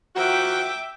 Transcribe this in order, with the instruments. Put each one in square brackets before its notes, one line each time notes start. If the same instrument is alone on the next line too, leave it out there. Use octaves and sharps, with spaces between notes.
[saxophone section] D#3 F3 F#4 [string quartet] E5 G5 D6